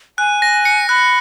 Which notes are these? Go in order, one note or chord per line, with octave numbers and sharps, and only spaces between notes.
G#5 F#6
A#6
C#7
B5 F#6